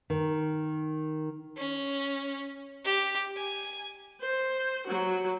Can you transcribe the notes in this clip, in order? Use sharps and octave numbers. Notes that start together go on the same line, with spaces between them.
D#3
C#4
G4
G#5
C5
F#3 F#4